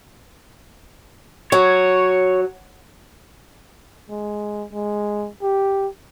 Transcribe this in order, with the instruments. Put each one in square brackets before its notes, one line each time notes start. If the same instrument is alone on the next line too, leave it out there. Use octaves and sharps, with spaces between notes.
[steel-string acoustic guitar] F#3 [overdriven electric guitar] C#5
[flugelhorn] G#3
G#3
G4